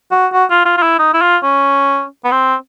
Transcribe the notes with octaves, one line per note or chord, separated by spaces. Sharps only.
F#4
F#4
F4
F4
F4
E4
D#4
E4
F4
C#4
B3
C4